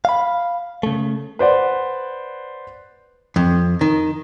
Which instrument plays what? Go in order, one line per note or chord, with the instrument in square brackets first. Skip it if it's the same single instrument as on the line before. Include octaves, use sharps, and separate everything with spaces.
[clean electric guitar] F5 B5
C#3 A3
[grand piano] B4 C5 D5 F#5
[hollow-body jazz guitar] F2
D#3